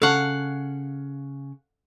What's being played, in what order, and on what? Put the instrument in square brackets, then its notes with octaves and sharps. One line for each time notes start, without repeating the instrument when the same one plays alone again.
[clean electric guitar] C#3 [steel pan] A4 C#6 [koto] F5 F#5